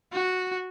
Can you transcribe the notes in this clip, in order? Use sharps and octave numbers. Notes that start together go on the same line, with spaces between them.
F#4